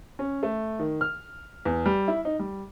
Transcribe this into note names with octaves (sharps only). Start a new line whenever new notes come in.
C#4
A3
D#3
F6
E2
G3
E4
D#4
G3